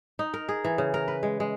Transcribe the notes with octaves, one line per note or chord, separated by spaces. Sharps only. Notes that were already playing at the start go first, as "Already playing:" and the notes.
D#4
A#4
G#4
E3
C#3
A#4
B4
G#3
G#3